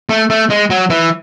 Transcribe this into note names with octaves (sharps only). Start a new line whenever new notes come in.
A3
A3
G#3
F#3
E3